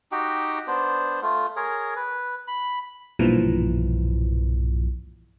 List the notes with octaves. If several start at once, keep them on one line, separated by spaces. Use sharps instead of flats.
D#4 F#4 G4 G5
B3 D4 C5
A3 F4
G#4 A#4 C#5
B4
B5
B1 G2 A#2 E3 F3